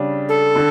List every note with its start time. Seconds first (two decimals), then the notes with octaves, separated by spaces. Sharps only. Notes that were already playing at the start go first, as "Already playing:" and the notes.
Already playing: C#3 G3 D4
0.29 A4
0.56 D3